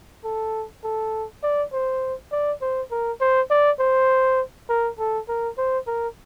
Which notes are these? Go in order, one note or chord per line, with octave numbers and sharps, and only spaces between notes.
A4
A4
D5
C5
D5
C5
A#4
C5
D5
C5
A#4
A4
A#4
C5
A#4